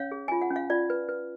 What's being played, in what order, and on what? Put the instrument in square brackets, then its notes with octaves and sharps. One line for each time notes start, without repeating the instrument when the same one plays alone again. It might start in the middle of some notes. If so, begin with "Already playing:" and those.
Already playing: [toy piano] C#4 C#5 F5
G#4
F4 G#5
F#5
C#4
F5
F4 D5
B4
B4